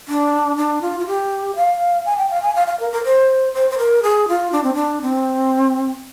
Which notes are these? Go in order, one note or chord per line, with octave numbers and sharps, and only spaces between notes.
D4
D4
F4
F4
G4
F5
G#5
G5
F5
G#5
F5
F5
A#4
A#4
C5
C5
C5
A#4
G#4
F4
D4
C4
D4
C4